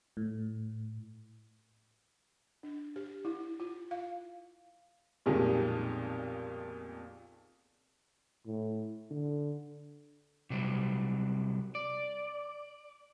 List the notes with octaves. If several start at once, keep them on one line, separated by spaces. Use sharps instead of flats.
A2
D4
G4
E4
F4
F5
B1 F2 A#2 D#3 G3 G#3
A2
D3
C3 F#3 G3
D5